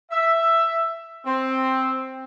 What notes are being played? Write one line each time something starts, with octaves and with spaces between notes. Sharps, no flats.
E5
C4